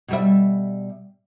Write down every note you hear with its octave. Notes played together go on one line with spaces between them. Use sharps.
B2 G3 E5